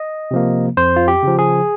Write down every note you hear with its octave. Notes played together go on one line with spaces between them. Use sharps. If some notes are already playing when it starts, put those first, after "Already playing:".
Already playing: D#5
C3 F3 A#3
F2 C5
F4
G4
C#3 F3
G#4